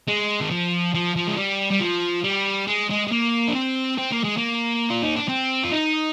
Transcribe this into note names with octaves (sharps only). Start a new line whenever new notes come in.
G#3
D#3
F3
F3
F3
G#3
G3
G3
F3
G3
G#3
G#3
G#3
A#3
D4
C4
C4
A#3
G#3
A#3
F4
D#4
D4
C4
F4
D#4